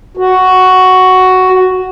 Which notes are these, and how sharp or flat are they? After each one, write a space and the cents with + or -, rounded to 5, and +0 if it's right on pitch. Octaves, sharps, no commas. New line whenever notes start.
F#4 +5